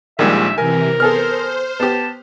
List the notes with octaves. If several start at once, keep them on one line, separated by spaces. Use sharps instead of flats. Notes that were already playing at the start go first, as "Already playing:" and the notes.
A#1 A#2 D#3 G3 G#3 E5
C3 E3 A#4 G#5
B3 G#4 A4 C5 F6
B3 G4 A5